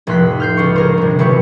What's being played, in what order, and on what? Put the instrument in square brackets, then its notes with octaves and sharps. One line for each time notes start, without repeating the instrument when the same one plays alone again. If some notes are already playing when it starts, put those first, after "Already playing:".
[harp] F1 A2 C6 F#6 B6
F6 G6 C7
C#2 C#6
G#4 A#4 C5
G1 C3
D#1 E3 F#3 G4 B4 C#6